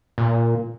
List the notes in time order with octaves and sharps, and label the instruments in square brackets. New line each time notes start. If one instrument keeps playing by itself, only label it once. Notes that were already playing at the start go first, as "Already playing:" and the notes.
[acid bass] A#2